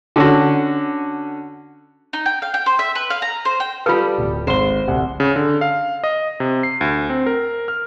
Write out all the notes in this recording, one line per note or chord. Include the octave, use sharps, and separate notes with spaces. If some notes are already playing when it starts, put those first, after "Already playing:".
D3 C#4 F#4
D#4
G5
F5
G5
C5
E5
B4
F5
A#5
C5
G5
G3 F4 A4 B4 F5 D#6
D1
G#1 C5 G7
D1 C2 F#5
C#3
D3
F5
D#5
C3
C7
D2
C4
A#4
F6